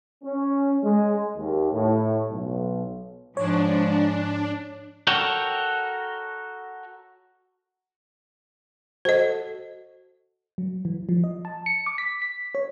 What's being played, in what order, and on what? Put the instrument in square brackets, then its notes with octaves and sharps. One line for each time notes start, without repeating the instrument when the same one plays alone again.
[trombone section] C#4
G#3
D#2
A2
B1
[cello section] G#2 F3 [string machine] D4 [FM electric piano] C#5
[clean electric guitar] F#4 A4 A#4 C#5 G5
[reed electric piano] F#4 A4 [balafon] C5 D#5
[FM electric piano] F#3
E3
F3
D#5
A5
C#7
D6
B6
B6
C#5